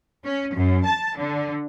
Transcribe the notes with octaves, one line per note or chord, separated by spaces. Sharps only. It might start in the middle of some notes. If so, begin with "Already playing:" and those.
C#4
F#2
A5
D3